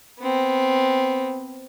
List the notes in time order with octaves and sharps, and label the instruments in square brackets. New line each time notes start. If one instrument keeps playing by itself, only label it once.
[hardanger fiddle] B3 C4